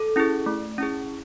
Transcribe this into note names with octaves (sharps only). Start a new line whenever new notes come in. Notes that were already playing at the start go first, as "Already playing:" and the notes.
Already playing: A4
C#4 E4 G#4
A3
C#4 E4 G#4